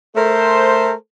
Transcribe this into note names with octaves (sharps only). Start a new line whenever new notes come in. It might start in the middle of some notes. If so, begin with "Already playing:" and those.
A3 A4 A#4 C5